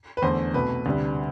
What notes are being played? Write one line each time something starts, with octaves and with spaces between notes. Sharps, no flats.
B4
E2 D3 A3 C5
C2 B2 A3 B4
D2 C3 G3